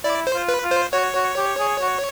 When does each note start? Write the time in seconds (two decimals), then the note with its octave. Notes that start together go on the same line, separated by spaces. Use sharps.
0.04 E4 D5
0.27 C5
0.34 F4
0.49 B4
0.63 F4
0.71 C5
0.93 F#4 C#5
1.15 F#4
1.37 G4
1.59 G#4
1.81 F#4